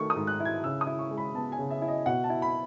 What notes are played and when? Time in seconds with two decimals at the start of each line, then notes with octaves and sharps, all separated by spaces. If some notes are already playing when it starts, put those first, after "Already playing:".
Already playing: D#3 A3 C#6
0.10 D#6
0.16 G#2
0.27 F#6
0.40 E4
0.45 G#6
0.64 C#3 E6
0.81 D#6
0.87 E4
0.99 C#6
1.11 G#3
1.18 B5
1.35 B3 A5
1.52 G#5
1.58 C#3
1.71 E5
1.82 E4
1.88 D#5
2.06 B2 F#5
2.24 A5
2.30 E4
2.42 B5